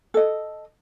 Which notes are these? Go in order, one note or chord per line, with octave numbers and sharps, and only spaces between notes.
A4 D#5